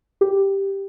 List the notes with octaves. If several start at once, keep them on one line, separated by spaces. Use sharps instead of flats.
G4